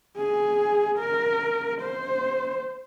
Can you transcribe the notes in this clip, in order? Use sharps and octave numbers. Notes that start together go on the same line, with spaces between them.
G#4
A#4
C5